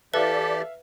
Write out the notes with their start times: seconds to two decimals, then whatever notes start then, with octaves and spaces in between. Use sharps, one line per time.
0.14 E3 G4 A4 B4 D5 E5 F5